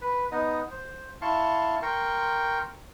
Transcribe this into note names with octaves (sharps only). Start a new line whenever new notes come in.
B4
B3 D#4 D#5
C5
E4 F5 A5 C6 C#6
A#4 G5 C6 C#6